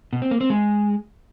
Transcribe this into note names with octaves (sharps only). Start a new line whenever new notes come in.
B2
C4
A#3
C4
G#3